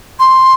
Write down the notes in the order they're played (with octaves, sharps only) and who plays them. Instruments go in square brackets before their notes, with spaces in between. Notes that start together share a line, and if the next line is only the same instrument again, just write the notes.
[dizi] C6